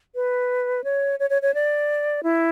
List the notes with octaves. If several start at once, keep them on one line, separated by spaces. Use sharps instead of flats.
B4
C#5
C#5
C#5
C#5
D5
E4